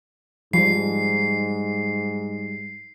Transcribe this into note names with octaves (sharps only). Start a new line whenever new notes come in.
G#2 F3 G3 C7